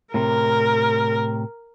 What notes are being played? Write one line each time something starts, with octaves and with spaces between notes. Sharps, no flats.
A2 C3 A#4